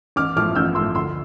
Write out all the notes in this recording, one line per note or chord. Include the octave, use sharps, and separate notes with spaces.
A1 D6 F6
A2 F3 D6 F6
A1 E6 G6
A2 F3 C6 E6
D2 C6 E6